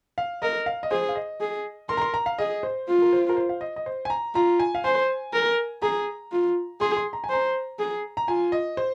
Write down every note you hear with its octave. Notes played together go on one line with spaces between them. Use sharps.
F5
A#4 D#5
F5
D#5
G#4 C5
F5
D#5
G#4
A#4 C6
A#5
C6
A#5
F5
G#4 D#5
C5
F4
A#4
C5
A#4
C5
F5
D#5
D#5
C5
G#5
A#5
F4 A#5
G#5
F5
C5 G#5
A#4
G#4 A#5
F4
G#4 C6
C6
A#5
G#5
C5 A#5
G#4
A#5
F4 G#5
D#5
C5